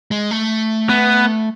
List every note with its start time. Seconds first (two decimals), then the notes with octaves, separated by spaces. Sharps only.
0.11 G#3
0.31 A3
0.89 B3